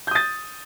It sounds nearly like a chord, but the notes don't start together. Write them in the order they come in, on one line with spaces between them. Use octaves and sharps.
G6 D#6 A6